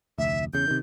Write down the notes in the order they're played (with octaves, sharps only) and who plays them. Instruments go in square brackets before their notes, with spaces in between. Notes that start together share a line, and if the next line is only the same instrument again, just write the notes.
[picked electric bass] F1 D2 [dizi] E5
[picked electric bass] E2 C#3 [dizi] G6
[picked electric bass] C3 D#3